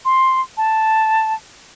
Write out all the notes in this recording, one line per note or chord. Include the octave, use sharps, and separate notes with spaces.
C6
A5